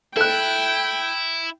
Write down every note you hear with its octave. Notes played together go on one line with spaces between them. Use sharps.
E4 A4 G5 F#6